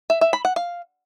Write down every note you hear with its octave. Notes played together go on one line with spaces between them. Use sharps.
E5
E5
B5
F#5
F5